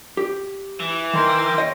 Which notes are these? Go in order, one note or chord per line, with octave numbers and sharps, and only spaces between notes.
G4
E3
D#3 A#4 G5 C6
C#5 D#5